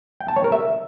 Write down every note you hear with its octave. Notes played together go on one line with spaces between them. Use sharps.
G5
A5
C#5
A#4
E5